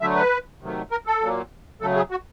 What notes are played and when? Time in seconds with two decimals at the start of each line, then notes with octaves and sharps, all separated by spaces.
0.01 D3 F#3 A3 E5
0.15 B4
0.61 C3 D#3 F#3 A3
0.91 A#4
1.07 A4
1.21 A#2 F#3 A#3
1.81 C#3 F#3 A3 A4
1.96 G#4
2.11 F#4